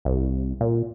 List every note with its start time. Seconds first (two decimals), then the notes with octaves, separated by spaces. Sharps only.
0.05 C2
0.61 A#2